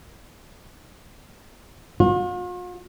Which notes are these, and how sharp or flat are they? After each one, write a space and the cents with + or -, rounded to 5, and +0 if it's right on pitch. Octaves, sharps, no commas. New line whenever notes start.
F4 +45